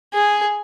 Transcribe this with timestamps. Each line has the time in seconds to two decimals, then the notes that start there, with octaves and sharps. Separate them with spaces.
0.13 G#4